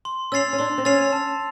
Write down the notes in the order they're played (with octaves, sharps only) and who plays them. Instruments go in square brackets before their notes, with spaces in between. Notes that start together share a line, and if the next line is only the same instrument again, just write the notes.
[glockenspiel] C6
[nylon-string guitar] C#4 [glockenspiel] E6 A6 C7 F7
[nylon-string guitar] C#4
[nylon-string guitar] D4 [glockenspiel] C6
[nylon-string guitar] C4
[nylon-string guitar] C#4 [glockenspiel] E6 A6 C7 F7
[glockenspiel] A5